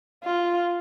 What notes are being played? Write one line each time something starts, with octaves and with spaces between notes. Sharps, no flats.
F4